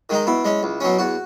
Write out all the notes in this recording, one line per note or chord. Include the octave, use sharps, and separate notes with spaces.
D#3 G#3 D#4
B2 E4
G#3 C#4
C#2
B2 F#3 C#4
E2 F#4